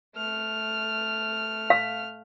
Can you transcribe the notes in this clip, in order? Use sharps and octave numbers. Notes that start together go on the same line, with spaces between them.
A3 F6
F5